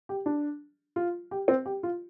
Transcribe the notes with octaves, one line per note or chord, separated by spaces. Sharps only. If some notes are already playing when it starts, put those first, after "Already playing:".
G4
D4
F4
G4
C4
G4
F4